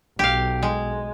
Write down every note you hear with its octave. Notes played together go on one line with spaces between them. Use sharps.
B1 G4 F5
G#3